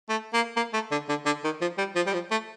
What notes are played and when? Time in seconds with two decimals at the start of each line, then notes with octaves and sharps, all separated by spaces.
0.09 A3
0.34 A#3
0.56 A#3
0.73 A3
0.91 D3
1.09 D3
1.26 D3
1.44 D#3
1.61 F3
1.78 G3
1.96 F3
2.07 G3
2.13 F3
2.31 A3